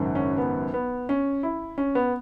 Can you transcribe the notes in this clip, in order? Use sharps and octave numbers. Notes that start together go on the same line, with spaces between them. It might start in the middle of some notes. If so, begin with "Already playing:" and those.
Already playing: G#1 F#2 C#3
C#4
B3
B3
C#4
E4
C#4
B3